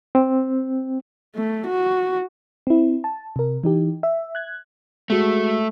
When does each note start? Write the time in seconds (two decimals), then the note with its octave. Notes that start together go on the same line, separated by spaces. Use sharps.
0.15 C4
1.35 A3
1.67 F#4
2.67 C4 E4
3.04 A5
3.36 C3 A#4
3.64 E3 D#4 G4
4.03 E5
4.35 F#6 G#6
5.10 G#3 A3 F#4